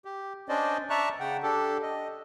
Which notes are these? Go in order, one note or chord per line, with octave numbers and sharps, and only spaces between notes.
G4
C#4 D4 C5 D5 D#5
D5 E5 A5 A#5 C#6 F#6
C#3 F#5 G5
D4 G4 A4
D#5